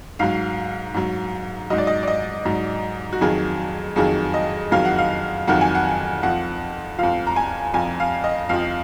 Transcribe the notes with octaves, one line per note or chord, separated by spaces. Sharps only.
G#2 F#3 F5
G#2 F#3
G#2 F#3 D#5
D5
D#5
D5
D#5
G#2 F#3
F#4
F2 D#3 F#3 G#4
F2 D#3 F#3 G#4
D#5
F2 D#3 F#3 F5
F#5
F5
F2 D#3 F#3 F#5
G#5
F#5
F2 F3 F#5
F2 F3 F5
A#5
G#5
F2 F3 G#5
F5
D#5
F2 F3 F5